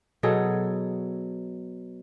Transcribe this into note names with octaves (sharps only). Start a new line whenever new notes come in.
B2 F#3 G#4 A4